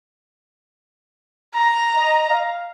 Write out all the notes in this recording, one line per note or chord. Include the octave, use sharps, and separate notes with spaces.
A#5
D#5
F5